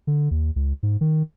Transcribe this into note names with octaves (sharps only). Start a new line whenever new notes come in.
D3
D#2
C#2
G#2
D#3